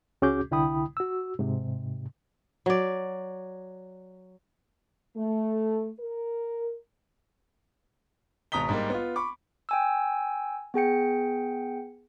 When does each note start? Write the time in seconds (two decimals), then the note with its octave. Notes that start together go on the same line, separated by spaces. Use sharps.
0.22 C#2 C#4 F#4 G#4 D6 G6
0.51 C2 D3 E4 G5 B5 D#6
0.97 F#4 E6
1.39 G#2 C3
2.66 F#3 D5
5.17 A3
6.00 A#4
8.52 G#1 B2 A#5 D#6 B6 G7
8.69 G#2 G3 A#3
8.90 B3 F4
9.16 B5 C#6 D6
9.69 G5 G#5 E6
10.74 B3 G#4 G5 C#7